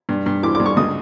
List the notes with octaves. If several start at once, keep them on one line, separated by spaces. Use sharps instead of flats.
G2
G2
E3 D6
D6
G2
C#6
C#2 D#6